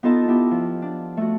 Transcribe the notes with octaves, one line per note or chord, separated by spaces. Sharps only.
B3 D#4 F4 A4 D#5 A5
B3 E4 G4
F3
D4
A3 F#4